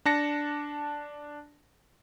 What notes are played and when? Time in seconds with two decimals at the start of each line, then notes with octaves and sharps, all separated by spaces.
0.05 D4 A5 A#6 C#7